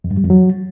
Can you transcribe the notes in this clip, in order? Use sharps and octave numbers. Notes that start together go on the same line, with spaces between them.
F2
G2
G3
F2
F#3